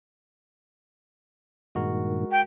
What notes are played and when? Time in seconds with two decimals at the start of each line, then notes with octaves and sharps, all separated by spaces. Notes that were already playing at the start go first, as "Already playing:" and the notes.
1.75 G2 A#2 D#3 G#3 F#4 A#4
2.32 G5